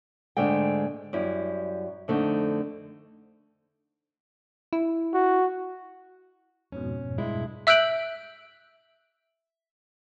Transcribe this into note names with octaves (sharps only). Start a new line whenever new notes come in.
G#2 D3 G#3 A3 G5
F#2 G3 E4
F2 D3 A3 D#4
E4
F#4
F2 G#2 B2 C#4
G2 G#3 E4
E5 E6 F#6 G6 D7 F#7